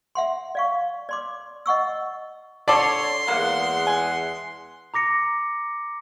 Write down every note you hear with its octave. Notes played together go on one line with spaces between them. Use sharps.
E5 F#5 C6
D5 F5 C#6
D5 C6 D6
D#5 F#5 C#6 E6
D3 A4 C#5 D5 C6
E2 G#3 A#3 F#5
G#5
A#5 D6 A#6 C#7